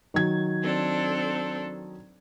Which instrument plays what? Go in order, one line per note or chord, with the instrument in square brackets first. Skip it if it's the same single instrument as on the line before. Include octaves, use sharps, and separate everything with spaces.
[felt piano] D#3 F#3 G#6
[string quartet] C4 D4 A4